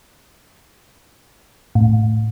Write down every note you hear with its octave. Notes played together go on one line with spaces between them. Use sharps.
A2